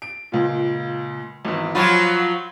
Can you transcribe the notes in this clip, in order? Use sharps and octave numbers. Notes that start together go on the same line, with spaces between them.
D7
C#2 A#2
G#1 E2
F3 F#3 F4 B5 C6 G#6